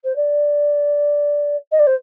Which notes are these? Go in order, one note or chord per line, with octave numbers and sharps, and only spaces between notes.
C5
D5
D#5
D5
C5